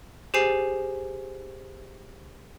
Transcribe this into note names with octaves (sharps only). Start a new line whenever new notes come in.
G4 G#4 C5 G#5 C7